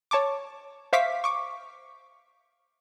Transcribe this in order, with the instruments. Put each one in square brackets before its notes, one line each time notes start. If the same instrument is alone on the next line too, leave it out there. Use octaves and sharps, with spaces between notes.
[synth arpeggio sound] C#5 A5 C#6 D6
C5 E5 F5 C#6 D6 B6
C#6 D6